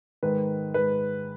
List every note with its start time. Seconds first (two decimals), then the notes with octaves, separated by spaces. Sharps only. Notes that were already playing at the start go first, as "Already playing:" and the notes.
0.23 G#2 D#3 B4
0.74 G#2 D#3 B4